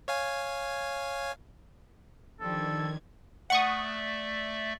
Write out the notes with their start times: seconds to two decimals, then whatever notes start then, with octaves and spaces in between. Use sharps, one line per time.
0.08 C#5 F5 G#5
2.40 D#3 F3 G3 D4 A4 G#6
3.50 A3 D5 E5 F#5 C#6 D#6